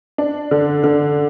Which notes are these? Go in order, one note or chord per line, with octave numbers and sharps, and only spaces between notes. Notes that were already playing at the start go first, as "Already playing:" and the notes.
D4
D3
D3